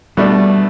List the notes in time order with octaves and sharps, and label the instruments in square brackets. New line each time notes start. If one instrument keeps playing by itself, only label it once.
[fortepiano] B2 A3 D4 [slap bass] G3